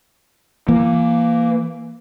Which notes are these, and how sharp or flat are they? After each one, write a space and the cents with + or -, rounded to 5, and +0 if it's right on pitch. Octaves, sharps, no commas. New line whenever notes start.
E3 +30 A#3 +0